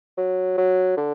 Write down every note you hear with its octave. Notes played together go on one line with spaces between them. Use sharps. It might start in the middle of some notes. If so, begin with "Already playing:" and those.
F#3
F#3
D3